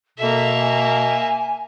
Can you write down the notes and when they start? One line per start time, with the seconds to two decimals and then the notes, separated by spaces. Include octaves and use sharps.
0.18 B2 A#3 A4 E5
0.59 G#5